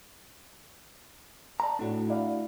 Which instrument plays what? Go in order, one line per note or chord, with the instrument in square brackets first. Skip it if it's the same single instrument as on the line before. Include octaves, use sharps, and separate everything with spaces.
[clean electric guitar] D5 A5 A#5
[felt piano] A2 [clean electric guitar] A3 D4 F#4
[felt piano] E4 D5 F5